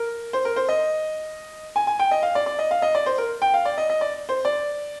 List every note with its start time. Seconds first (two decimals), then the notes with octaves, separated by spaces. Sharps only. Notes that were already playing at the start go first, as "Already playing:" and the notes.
Already playing: A#4
0.33 C5
0.45 A#4
0.56 C5
0.69 D#5
1.76 G#5
1.87 G#5
1.99 G5
2.11 D#5
2.23 F5
2.35 D5
2.46 D5
2.59 D#5
2.71 F5
2.82 D#5
2.95 D5
3.06 C5
3.18 A#4
3.42 G5
3.54 F5
3.65 D5
3.78 D#5
3.90 D#5
4.01 D5
4.29 C5
4.45 D5